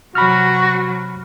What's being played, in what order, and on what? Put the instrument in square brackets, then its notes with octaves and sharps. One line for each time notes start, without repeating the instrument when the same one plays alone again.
[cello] C3 F#3 [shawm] F#4 [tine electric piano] B5 F6